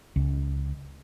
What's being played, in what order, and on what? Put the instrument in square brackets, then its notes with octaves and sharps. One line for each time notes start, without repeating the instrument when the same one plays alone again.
[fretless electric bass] C#2